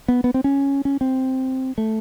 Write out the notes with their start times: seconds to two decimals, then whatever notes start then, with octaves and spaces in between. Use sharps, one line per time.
0.08 B3
0.24 B3
0.34 C4
0.44 C#4
0.85 C#4
1.01 C4
1.78 A3